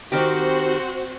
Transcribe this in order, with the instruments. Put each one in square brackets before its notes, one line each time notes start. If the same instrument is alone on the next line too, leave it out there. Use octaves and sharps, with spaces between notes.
[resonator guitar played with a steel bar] D#3 G4 [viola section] C4 F#4 C5